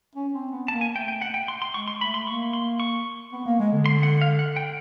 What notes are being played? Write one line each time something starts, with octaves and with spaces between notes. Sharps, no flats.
C#4
C4
B3
A#3 A5
G#5
A3 G5
G5
F#5
G5
C6
C6
G#3 C#6
C6
A3 B5
C6
A#3 C#6
C6
C#6
B3
A#3
G#3
D3
C6
F#5
F5
F#5
G5